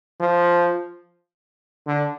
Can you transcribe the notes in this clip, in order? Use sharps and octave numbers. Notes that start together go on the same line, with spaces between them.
F3
D3